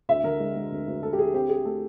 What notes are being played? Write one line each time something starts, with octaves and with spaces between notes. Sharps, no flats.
D2 E5
D3 A#4
G#3
G#3
D2
D2
D2 A4
G4
D2 G#4
C4 G4
C4 G#4
A3 A4